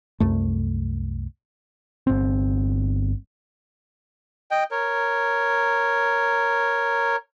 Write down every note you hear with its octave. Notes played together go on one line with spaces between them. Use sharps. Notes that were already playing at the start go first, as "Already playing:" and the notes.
C2 F#2 A3
G1 C4
D#5 G5
A#4 C#5